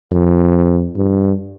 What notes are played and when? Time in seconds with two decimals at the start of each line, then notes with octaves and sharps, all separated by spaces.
0.11 F2
0.96 G2